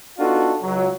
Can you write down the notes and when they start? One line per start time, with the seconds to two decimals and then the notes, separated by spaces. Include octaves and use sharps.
0.19 B3 D4 D#4 F4 F#4 A4
0.62 C#2 F#3